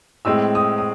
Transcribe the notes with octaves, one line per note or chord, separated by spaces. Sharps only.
A2 G#3 C4 E6
D#6
D#6